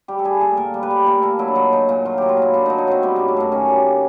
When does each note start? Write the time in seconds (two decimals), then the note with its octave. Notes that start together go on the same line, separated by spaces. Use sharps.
0.08 G3 G4
0.19 A4
0.24 G3 G#4
0.41 A#2 A4
0.57 A#2 A#4
0.74 G3
0.83 B4
0.91 G3
1.06 A#2 A#4
1.23 A#2 A4
1.39 F#3 E4
1.48 D4
1.55 F#3 D#4
1.72 A#2 D#4
1.89 A#2 D#4
2.05 F#3 F4
2.18 F#3 G4
2.29 F4
2.37 A#2 E4
2.54 A#2 D4
2.66 F#3 D#4
2.78 D#4
2.87 F#3 C4
3.03 G3 B3
3.16 F#2 A#3
3.28 A3
3.37 F#2 A#3
3.52 D#3 C#4
3.68 G3